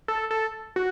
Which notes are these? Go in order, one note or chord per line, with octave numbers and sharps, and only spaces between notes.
A4
A4
F#4